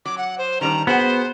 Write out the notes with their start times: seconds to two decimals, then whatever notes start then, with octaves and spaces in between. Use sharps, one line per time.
0.06 F#3 D6
0.18 F#5
0.38 C5
0.61 D#3 G3 D4 A#5
0.87 B3 F#4 G#4 C5 F#5